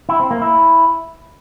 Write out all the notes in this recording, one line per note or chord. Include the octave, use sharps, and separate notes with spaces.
E4
C4
A#3
E4